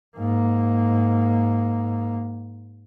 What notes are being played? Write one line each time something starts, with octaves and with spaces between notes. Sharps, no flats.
G#2 A#3